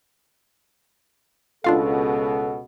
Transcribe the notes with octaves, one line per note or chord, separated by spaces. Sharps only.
C#2 B2 D4 F4 A4 F5